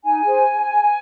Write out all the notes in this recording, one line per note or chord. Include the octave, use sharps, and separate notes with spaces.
D#4 G#5
G#4 C5